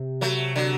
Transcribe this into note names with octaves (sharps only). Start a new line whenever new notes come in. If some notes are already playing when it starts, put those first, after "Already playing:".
Already playing: C3
F#3 A3
D3 F#3